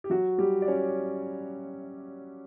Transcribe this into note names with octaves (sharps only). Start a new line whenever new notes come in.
G4
F#3 F#4
G3 G4
D5
C#4 C#5